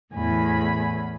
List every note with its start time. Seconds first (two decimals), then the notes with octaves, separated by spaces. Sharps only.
0.13 E2 A2 G#5 B5